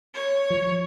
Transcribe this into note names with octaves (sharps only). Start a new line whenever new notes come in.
C#5
F3